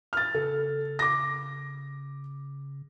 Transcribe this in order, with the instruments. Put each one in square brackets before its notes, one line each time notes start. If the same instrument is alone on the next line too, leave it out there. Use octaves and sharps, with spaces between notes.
[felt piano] F6 A6
[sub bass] C#3 [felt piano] A4
[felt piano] D6 A#6